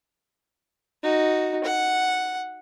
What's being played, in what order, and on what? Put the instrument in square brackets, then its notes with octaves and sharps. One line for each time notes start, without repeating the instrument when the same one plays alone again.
[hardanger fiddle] D#4 F#4
F#5